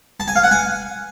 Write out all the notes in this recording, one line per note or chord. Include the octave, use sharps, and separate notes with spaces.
A5
G#5
F5
F#5
G#5